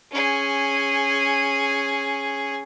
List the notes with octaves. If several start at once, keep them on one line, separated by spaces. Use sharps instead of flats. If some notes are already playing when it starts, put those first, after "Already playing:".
C#4 G#4